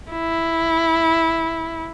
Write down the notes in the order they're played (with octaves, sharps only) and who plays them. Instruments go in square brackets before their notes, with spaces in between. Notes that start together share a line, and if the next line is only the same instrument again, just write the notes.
[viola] E4